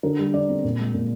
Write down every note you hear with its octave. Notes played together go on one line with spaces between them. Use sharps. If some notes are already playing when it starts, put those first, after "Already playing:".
D3 A#4
G3
D3 D5
C4
A#2
G#3
A#2